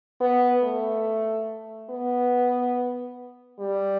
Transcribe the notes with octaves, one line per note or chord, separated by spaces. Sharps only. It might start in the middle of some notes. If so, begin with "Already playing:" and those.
B3
A3
B3
G3